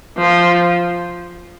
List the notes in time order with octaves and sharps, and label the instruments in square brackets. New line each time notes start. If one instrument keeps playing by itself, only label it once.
[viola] F3